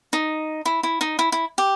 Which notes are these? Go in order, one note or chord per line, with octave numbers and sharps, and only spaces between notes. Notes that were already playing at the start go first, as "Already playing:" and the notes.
D#4
E4
E4
D#4
E4
E4
G4